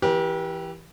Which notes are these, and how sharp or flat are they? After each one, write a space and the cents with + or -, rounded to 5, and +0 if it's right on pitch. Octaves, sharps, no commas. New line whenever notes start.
E3 +5 G4 +0 B4 -45